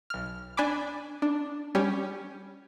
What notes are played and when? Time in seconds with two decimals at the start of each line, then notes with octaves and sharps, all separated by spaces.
0.10 B1 F6
0.57 D4 G#5 B5 D6
1.22 D4
1.75 G3 C#4 G4